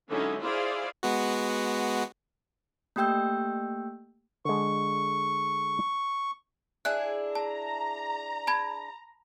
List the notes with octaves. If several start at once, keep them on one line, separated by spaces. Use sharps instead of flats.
D3 F#3 G#3 C#4 D#4 E4
E4 F4 G#4 C5 D5 F5
G#3 B3 F#4
A3 A#3 G4 G5 E6 G6
D3 G#3 C#6
D4 E4 G#4 F#6
A5 A#5
A5 B5 G#6